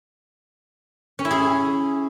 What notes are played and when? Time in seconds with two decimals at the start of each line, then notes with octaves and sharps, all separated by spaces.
1.19 C#4
1.25 E4
1.31 G#4